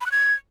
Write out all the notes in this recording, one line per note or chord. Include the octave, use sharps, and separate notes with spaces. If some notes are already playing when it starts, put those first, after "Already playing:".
B5
F#6
G#6